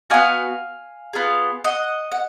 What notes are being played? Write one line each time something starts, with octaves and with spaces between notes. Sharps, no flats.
B3 D4 F#4 F5 G#5
B3 F4 G#4
D#5 F#5
F#5